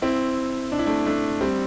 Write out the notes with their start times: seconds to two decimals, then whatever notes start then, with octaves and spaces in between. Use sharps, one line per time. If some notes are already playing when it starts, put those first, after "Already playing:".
0.02 C4 E4
0.72 D4
0.79 E4
0.87 A3 D4
1.06 A3 D4
1.41 G3 C4